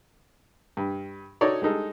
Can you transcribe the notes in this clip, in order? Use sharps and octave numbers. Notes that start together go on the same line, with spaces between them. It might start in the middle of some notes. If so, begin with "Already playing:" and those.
G2
D#4 F#4 A4 C#5 D5
G3 G#3 D#4 A4